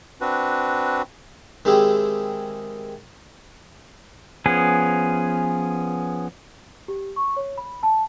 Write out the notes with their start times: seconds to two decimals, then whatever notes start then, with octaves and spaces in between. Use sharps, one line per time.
0.21 C4 D4 F#4 B4
1.65 D#3 G#3 C4 E4 G4 G#4
4.46 F3 B3 C#4 G#4
6.88 G4
7.16 C#6
7.36 C#5
7.58 B5
7.83 A5